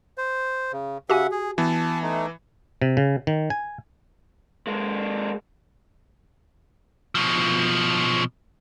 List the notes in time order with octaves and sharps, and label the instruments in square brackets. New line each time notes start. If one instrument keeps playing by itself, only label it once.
[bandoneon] C5
C#3
[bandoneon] C#3 E5 F#5 [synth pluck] F#4 G4 G#5
[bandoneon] G#4
[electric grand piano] E3 B3 [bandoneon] A5
[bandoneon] A3 D#4
[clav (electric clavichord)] C3
C#3
D#3
G#5
[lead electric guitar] G#3 A#3
B2 F3